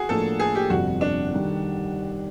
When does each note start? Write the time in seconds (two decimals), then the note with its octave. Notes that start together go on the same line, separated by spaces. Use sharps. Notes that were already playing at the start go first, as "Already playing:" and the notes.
Already playing: F#4 G#4
0.09 A2 F3 A#3 D4 A4
0.39 G#4
0.55 G4
0.70 G1 F2 C3 F#4
1.01 D4
1.34 D#3 G3